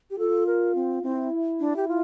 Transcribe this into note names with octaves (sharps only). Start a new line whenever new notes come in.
G4
F4 A4
A#4
C4
C4 E4
D4
G4
F4